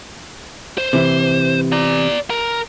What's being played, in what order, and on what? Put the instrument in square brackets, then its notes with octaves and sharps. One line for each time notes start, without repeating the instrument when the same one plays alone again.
[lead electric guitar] C5
[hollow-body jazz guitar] C3 E3
[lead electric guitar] D5 A#5
A#4